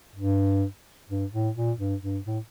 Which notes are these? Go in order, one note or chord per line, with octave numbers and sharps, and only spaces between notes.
G2
G2
A2
A#2
G2
G2
A2